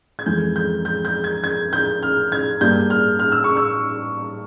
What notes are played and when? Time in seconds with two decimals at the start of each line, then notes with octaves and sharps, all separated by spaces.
0.19 G#6
0.26 F2 E3 G#3 G6
0.56 G6
0.85 G6
1.05 G6
1.24 G#6
1.44 G#6
1.73 G6
2.03 F6
2.32 G#6
2.61 G2 G3 A#3 G6
2.90 F6
3.19 F6
3.32 E6
3.44 C#6
3.57 E6